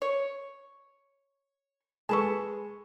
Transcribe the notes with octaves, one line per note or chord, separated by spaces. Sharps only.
C#5
G#3 A4 B4 A5 C#6